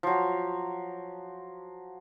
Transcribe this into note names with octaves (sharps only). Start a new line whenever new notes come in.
F3 F#3